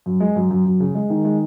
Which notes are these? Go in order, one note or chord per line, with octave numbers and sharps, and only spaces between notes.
F#2
G#3
F#2
F#2
F#2
C#3
G#3
D#3
G#3